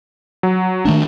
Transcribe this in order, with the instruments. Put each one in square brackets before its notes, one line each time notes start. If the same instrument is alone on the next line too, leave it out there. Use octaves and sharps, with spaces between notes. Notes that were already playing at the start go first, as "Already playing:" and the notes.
[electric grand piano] F#3
[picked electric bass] D#3 A3 D4